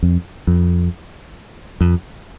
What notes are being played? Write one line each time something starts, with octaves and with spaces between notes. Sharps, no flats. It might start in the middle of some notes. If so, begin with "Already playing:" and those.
F2
F2
F2